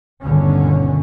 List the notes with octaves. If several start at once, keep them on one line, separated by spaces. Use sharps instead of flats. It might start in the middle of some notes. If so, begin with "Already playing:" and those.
G1 D#2 B2 D3 C#4